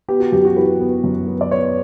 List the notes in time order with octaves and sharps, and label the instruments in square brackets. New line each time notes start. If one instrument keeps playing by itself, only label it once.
[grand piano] B3 G4
F#4
F#2 G4
F#4
E3 B4
B3
F#2
B3
D5
B3 C#5